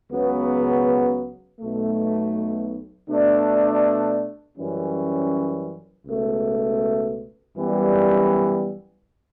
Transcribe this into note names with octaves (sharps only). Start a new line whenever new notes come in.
C#2 C#3 F#3 B3
B1 B2 A3
B2 A3 D4
F#2 E3 G3 C#4
C#2 B2 A3
F#2 E3 G3 B3